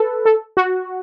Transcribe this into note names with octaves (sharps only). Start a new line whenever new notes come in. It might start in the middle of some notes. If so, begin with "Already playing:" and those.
Already playing: A4 B4
A4
F#4